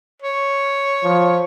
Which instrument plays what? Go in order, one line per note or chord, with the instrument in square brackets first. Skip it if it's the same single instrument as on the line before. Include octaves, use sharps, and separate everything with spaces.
[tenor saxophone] C#5
[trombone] F3